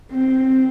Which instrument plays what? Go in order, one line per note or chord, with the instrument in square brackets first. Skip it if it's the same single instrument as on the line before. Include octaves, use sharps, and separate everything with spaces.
[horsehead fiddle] C4